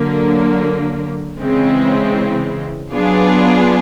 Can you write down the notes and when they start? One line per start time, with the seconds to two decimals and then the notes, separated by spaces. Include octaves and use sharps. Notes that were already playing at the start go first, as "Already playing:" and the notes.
Already playing: D3 F#3 A#3
1.39 C#3 E3 G#3 C4
2.93 F#3 B3 D4 F4 G#4